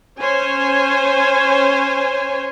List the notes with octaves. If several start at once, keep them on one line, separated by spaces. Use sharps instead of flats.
C#4 C5 C#5 G#5